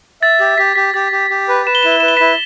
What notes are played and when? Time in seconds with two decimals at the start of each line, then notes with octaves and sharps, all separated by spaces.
0.22 E5 A6
0.39 G4 A6
0.58 G4 B6
0.75 G4 B6
0.94 G4 A6
1.12 G4
1.30 G4
1.48 B4
1.66 B4 E7
1.75 G7
1.83 E4 E7
1.92 G7
2.00 B4 E7
2.08 G7
2.17 E4 B6 E7